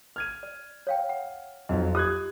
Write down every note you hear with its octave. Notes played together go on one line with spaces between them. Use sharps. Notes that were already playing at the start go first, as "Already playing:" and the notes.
F6 G#6 D#7
D5
C#5 F5 G5
F#5
F2 F#3 D#4 D#5
F4 G4 D#6 F#6 G#6